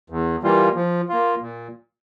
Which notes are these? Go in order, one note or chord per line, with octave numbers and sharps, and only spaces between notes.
E2
E3 G3 A#3 F4
F3
A#3 F4
A#2